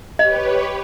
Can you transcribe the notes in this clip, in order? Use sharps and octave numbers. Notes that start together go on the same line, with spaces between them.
G4 B4 C#5 D#5